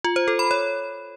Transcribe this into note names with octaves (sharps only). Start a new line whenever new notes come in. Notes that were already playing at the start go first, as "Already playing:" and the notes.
F4
C5
A4
B5
C#5